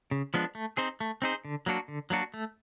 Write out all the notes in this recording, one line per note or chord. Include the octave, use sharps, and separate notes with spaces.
C#3
F3 G#3 B3 D4
A3
C4 D#4 G#4 C5
A3
C4 D#4 G#4 C5
D3
F#3 A#3 D4 F#4
D3
F#3 A#3 D4 F#4
A3